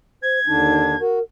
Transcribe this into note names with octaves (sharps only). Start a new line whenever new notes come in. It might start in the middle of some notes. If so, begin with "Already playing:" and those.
C5 G#6
D#2 D3 D4 D#4
F#4 A#4